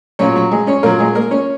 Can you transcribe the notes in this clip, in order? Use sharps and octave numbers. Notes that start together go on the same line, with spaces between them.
A#2 F#3 C#4 C#5
F#3 F#4
G#3 G#4
C#4 C#5
A#2 F#3 A#3 A#4
G#3 G#4
A#3 A#4
C#4 C#5